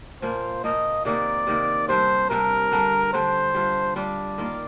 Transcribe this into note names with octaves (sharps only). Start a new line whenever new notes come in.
A#2 F3 A#3 C5
A#2 F3 A#3 D#5
C3 D#3 A#3 D#4 D5
C3 D#3 A#3 D#4
C3 G3 D4 C5
C3 G3 D4 A#4
D3 G3 D4
D3 G3 D4 C5
G3 D4 F4
G3 D4 F4 D5
D#3 A#3 F4